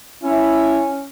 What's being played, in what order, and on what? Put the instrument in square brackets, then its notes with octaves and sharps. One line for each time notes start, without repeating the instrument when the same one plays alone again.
[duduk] C#4 [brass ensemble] E4